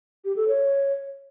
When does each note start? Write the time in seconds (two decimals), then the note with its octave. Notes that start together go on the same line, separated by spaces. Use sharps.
0.25 G4
0.36 A4
0.48 C#5